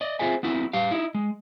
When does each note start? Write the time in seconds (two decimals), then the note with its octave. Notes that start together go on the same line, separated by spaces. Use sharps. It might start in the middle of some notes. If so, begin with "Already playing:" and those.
0.01 D5 D#5
0.19 C4 F4 G#4 C5 E5 G#5
0.43 B3 C4 E4 F#4
0.73 G3 G4 F5
0.91 D#4 E4
1.15 G#3